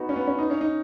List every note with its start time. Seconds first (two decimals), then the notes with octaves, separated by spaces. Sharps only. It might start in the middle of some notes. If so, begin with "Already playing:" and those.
Already playing: B3 D#4 F#4
0.09 C#4
0.16 B3
0.27 C#4
0.39 D#4
0.50 C#4
0.61 D#4